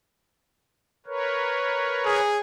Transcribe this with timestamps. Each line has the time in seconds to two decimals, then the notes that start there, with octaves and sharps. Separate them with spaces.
1.06 A#4 B4 C#5
2.06 G#4